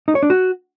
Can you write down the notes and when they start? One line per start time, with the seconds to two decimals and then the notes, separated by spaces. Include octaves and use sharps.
0.08 D#4
0.15 C#5
0.23 D4
0.30 F#4